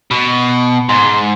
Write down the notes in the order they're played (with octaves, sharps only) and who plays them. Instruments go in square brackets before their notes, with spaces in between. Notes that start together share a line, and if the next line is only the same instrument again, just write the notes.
[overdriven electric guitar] B2
[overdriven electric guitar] G#2 [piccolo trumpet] C6